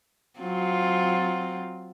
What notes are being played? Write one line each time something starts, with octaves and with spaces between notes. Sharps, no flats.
F#3 C4 F4